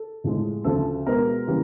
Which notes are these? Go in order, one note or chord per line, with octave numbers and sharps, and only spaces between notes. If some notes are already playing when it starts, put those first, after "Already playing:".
Already playing: A4
A2 F3 G#3
D2 C#3 F3 A4
B2 G#3 B3 A#4
C#3 E3 G3 A#3